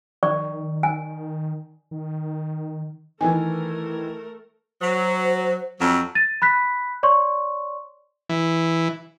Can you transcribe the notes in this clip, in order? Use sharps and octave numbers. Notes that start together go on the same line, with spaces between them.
D#3 D5 C#6
G#5
D#3
D#3 E3 A3 A#4 B4 G#5
F#3 C5
F2 F#3
A6 D#7
B5 F#6 B6
C#5 D5 C6 C#6
E3